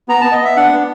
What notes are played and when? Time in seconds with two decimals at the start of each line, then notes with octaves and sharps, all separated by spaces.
0.08 B3 A#5
0.21 B3 A5
0.32 D#5
0.41 B3 E5
0.56 D4 F#5
0.72 B3